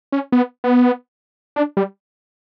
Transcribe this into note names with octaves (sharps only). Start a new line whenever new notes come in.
C#4
B3
B3
D4
G3